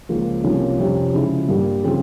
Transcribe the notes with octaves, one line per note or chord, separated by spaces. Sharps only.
C#2 C#3 F3 A#3
C2 C3 F3 A#3 C#4
F2 C3 G3 C#4
C#3 F3 G#3 C#4 E4
G2 G3 A#3
C#3 F3 C4